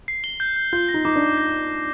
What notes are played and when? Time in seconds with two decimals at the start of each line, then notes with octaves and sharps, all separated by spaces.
0.08 C7
0.24 G7
0.40 G6
0.56 G6
0.73 F4 G6
0.89 A#6
0.94 D#4
1.05 D#4 D6
1.16 D4
1.22 D6
1.38 A#6